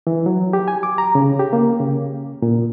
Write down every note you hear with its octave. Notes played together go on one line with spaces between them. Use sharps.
E3
F#3
G4
G#5
D6
A#5
C#3
G4
A#3
C#3
A#2